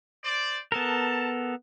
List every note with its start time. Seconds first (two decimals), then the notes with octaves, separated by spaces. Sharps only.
0.24 C5 D5
0.72 B3 A4 A#4 A5